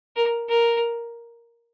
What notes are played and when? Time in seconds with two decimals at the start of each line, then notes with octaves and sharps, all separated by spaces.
0.16 A#4
0.48 A#4